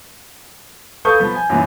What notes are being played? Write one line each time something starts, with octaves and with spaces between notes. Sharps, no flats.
A4 B4 F5 C#6 D#6 G6
F3 B3
G#5
F#2 A#2 E3